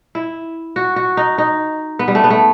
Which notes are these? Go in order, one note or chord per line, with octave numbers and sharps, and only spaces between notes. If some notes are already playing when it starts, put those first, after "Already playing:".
E4
F#4
F#4
D#4
D#4
B3
G3
A3
B3
A3